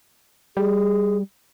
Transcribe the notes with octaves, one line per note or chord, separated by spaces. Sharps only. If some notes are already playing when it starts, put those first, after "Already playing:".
G3 G#4